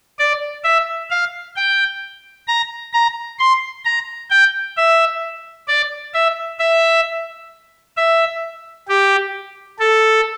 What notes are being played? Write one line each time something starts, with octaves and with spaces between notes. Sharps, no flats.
D5
E5
F5
G5
A#5
A#5
C6
A#5
G5
E5
D5
E5
E5
E5
G4
A4